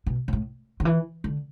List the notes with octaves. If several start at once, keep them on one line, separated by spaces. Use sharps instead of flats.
B2
B2
A2
D3
E3
D3